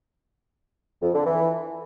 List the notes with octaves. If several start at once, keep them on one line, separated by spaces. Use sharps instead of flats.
F2
D3
E3